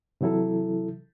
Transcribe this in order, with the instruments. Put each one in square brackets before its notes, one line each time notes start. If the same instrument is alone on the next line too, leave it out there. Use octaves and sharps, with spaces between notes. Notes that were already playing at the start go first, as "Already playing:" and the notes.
[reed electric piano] C3 E3 F#3 E4 A4